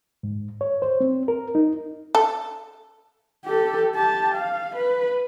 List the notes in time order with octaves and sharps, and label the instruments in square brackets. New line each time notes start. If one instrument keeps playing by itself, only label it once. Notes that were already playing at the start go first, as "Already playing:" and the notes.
[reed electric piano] G#2
C#5
C5
C4
A#4
D#4
[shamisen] A4
[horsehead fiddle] G4 A4
G4 A5
F5
B4